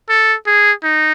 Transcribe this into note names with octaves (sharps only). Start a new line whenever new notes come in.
A4
G#4
D#4